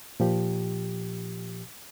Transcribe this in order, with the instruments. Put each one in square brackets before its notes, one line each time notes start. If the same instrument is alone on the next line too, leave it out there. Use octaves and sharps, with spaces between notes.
[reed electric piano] A#2 F3 G4